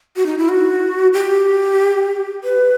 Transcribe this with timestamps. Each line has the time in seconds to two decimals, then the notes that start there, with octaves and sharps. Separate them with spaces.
0.16 F#4
0.26 D#4
0.38 E4
0.49 F#4
1.13 G4
2.44 B4